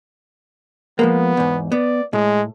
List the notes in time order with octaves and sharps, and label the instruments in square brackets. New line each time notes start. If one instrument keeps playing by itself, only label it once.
[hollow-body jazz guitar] F3 G#3 A#3 [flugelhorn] B3
[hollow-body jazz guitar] E2 G#2
[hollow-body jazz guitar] B3 [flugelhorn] D5
[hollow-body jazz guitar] A2 [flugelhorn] G#3